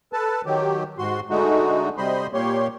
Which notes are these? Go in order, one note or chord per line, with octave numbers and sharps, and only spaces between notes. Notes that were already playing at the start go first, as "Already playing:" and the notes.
A4 B4 A5
D#3 F#3 G4
G#2 F#4 C6
D3 G#3 A3 D#4 F#4
C3 G3 C5 D#5 B5 C6
A#2 A#3 G4 C#5 C6